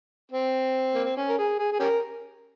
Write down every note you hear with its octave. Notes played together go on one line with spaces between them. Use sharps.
C4
A#3
C4
C#4
A#4
G#4
G#4
G#4
C#4 G4 A#4